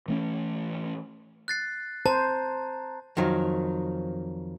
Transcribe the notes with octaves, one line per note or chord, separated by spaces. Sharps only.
E3 A3 C#4
F#6 A6 C7
C5 A5 A#5
F2 D#3 F#3